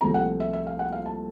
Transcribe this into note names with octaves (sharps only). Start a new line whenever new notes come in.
C2 A#2 F3 A3 C4 A#5
F#5
E5
E5
F5
F#5
F5
A5